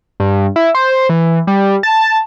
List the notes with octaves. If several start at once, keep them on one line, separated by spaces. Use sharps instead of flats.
G2
E4
C5
E3
G3
A5